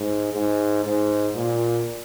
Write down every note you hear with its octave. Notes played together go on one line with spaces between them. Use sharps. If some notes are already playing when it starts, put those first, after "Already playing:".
Already playing: G#2
G#2
G#2
A#2